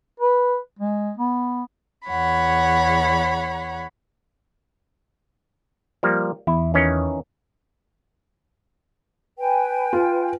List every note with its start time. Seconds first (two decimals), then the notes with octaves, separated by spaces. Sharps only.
0.20 B4
0.79 G#3
1.17 B3
2.07 E2 C#5 F#5 B5
6.03 F3 G3 A#3
6.47 E2 E4
6.74 D#3 E3 C#4
9.39 B4 G5 G#5
9.93 F4